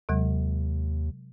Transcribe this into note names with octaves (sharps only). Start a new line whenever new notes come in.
D#2 C3 F#3 G#3